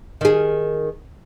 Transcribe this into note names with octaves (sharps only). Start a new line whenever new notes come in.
D#3 G#4